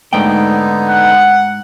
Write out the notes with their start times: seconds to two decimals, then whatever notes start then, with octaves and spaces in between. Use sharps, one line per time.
0.13 G#2 D3 A3 B3 D#4 G5
0.89 F#5